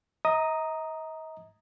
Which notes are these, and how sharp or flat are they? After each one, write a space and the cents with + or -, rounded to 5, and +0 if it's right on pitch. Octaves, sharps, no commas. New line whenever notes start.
D#5 +40 A#5 +0 D#6 +0